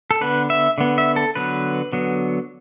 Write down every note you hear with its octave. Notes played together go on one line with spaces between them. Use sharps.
A4
D3 B3 B4
E5
D3 B3
E5
A4
D3 F#3 B3 B4
D3 F#3 B3